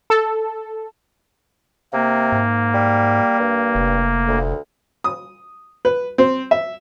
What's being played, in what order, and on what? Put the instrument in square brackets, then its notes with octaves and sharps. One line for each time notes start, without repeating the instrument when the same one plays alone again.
[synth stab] A4
[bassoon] C3 [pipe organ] A#3
[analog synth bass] G#2
[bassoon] G3
G2
[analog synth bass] F1
[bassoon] D2
[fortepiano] D#6
B4
C4
E5